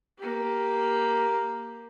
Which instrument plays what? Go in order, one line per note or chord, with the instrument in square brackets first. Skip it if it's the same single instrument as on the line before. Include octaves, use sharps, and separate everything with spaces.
[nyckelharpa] A#3 G4